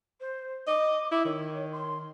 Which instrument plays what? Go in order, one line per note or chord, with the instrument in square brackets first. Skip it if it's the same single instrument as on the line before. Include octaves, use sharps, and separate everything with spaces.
[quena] C5
[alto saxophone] D#5 [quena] D6
[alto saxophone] E4 [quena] D6
[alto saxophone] D#3 [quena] C#5
[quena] C6